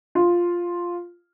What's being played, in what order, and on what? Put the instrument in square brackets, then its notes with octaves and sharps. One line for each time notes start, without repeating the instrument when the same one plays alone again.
[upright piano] F4